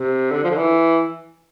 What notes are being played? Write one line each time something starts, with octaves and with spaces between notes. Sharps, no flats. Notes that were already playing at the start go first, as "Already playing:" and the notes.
Already playing: C3
D3
F3
D3
E3